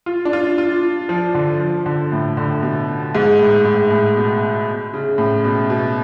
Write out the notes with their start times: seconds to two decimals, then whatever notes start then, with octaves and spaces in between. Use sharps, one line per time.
0.06 F4
0.25 D4
0.33 F4
0.58 F4
1.09 F3
1.35 D3
1.60 F3
1.86 D3
2.12 A2
2.37 D3
2.63 B2
3.15 G#2
3.40 A2
3.65 G#2
3.91 A2
4.17 B2
4.94 C#3
5.18 A2
5.45 B2
5.70 B2